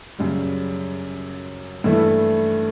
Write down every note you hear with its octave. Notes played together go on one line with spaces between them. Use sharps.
F#2 C#3 G3
G2 E3 A3 E4